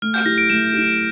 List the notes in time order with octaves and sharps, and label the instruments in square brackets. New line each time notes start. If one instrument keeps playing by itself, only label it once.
[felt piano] A3 [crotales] F6
[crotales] G6
[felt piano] E4 G4 [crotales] A#6
[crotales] D7
[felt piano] A3 [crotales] E7
[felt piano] E4 G4